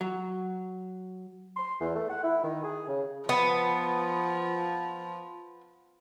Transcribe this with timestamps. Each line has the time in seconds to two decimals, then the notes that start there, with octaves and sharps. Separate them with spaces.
0.01 F#3
1.57 C6
1.80 E2
1.95 A3
2.10 F#5
2.24 E4
2.44 D#3
2.63 G#4
2.88 C#3
3.29 F3 B3